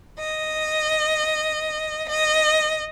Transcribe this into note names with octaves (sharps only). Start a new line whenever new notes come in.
D#5
D#5